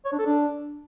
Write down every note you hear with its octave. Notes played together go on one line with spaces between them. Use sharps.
C#5
D4
A4
D4